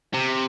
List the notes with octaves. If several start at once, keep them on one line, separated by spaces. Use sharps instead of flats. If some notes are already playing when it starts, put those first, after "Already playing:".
C3